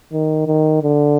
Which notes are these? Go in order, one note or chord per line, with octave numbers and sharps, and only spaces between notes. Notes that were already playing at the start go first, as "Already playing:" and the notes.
D#3
D#3
D3